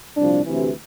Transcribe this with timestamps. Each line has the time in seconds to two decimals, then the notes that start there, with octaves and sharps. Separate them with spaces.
0.17 C2 A#2 F3 D4
0.46 D2 C3 E3